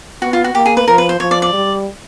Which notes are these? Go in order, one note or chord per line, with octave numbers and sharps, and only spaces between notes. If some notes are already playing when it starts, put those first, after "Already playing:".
B3 F#4
F4
F#4
A#3 G4
G#4
B4
F3 A#4
B4
C5
F3 C#5
D5
D5
G3